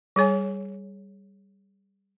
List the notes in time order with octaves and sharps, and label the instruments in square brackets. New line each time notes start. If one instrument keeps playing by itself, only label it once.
[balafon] G3 G#4 C#5 G#5